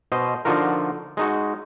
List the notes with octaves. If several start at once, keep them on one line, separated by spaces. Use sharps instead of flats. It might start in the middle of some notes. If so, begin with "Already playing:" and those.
B2 C5 D#5
D3 F3 D#4 F4 F#4 A#4
G#3 D#4 F#4